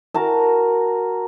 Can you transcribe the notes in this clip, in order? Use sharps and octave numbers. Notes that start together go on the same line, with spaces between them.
F#4 A#4 A5